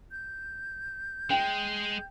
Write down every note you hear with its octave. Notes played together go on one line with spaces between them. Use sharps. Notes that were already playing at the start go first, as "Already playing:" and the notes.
G6
G#3 G5